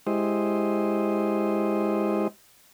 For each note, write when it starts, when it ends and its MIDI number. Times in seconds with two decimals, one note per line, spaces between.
0.07 2.28 56
0.07 2.28 64
0.07 2.28 67
0.07 2.28 72
0.07 2.28 75